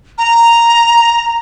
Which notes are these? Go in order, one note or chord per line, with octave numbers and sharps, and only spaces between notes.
A#5